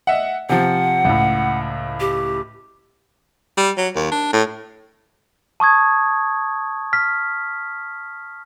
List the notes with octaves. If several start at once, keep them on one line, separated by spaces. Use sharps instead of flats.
D#5 E5 F#5
C3 F3 F#5
C#2 A2
G4
G3
F#3
D#2
D4
A2
A5 C#6 D#6 G#6
F6 B6